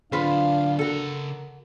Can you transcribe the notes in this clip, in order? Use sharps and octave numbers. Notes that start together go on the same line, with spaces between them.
D3 F#3 D4 F4 B4 C5 F5
C#3 F#4 A4 A#4 F#5